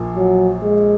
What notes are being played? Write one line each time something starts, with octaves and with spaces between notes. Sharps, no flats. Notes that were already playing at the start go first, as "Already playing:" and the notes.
Already playing: A#1 A#2 A#3
F#3
G#3